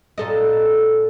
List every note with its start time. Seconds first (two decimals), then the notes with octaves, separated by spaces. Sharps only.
0.18 A#2 A4 D#5